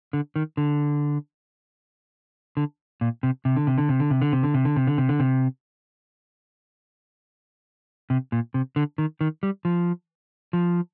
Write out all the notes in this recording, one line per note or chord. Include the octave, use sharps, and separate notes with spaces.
D3
D#3
D3
D3
A#2
C3
C3
D3
C3
D3
C3
D3
C3
D3
C3
D3
C3
D3
C3
D3
C3
D3
C3
C3
A#2
C3
D3
D#3
D#3
G3
F3
F3